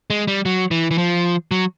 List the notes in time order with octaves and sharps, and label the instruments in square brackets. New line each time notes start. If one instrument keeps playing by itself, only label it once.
[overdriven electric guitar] G#3
G3
F#3
E3
E3
F3
F#3